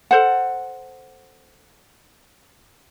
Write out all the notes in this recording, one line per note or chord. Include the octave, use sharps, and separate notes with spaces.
A4 C5 F#5